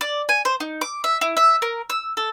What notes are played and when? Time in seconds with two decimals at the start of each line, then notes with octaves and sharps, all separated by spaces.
0.01 D5
0.29 G#5
0.45 C5
0.60 D#4
0.81 D6
1.04 E5
1.21 E4
1.37 E5
1.62 A#4
1.90 E6
2.17 A4